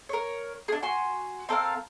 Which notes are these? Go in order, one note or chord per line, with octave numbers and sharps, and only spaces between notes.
A#4 C#5
D4 G#4
F#4 G#5 C6
C4 A4 A#4 F5